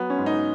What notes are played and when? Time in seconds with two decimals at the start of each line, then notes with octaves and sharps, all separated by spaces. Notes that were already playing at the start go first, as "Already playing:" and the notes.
Already playing: F#3 B3
0.10 C#4
0.18 G#2
0.26 D#4